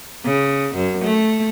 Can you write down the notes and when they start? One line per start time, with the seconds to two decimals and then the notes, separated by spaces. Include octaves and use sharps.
0.24 C#3
0.75 F#2
1.05 A3